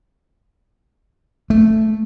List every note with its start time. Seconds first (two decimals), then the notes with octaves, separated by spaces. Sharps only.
1.50 A3